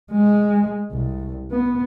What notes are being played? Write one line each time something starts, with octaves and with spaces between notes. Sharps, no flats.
G#3
C2
B3